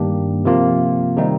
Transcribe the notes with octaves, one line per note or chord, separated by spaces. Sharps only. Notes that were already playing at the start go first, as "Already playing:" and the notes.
Already playing: G2 D#3 A#3 D4 G4
C3 F3 A#3 F4
C3 D#3 G3 C4 D#4